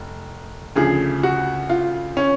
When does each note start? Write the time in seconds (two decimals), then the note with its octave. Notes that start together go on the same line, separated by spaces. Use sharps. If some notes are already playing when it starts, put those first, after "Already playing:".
Already playing: F1
0.76 D2 C#3 F3 G#4
1.23 F#4
1.70 F4
2.17 C#4